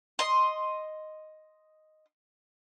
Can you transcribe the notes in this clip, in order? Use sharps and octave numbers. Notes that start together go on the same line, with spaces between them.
D#5 C6